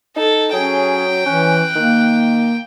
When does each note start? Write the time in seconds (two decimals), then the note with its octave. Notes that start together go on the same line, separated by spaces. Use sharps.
0.16 D#4 A4
0.53 F#3 C#4 G#4 G5
1.26 E3 C#4 F#6
1.76 D#3 A#3